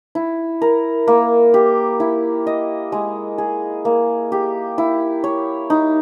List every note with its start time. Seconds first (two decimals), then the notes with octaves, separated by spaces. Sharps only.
0.15 E4
0.62 A#4
1.07 A#3
1.54 G4
2.00 E4
2.47 D#5
2.92 G#3
3.38 G#4
3.85 A#3
4.32 G4
4.78 E4
5.24 C#5
5.70 D#4